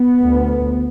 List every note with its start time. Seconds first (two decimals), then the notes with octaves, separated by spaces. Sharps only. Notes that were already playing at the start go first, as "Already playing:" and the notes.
Already playing: B3
0.23 D2